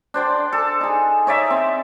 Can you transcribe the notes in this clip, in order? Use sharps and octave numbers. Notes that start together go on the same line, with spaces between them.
D4 C5 D5 G5
A4
D#4 G#4
D#4 C#5 D5 E5
C4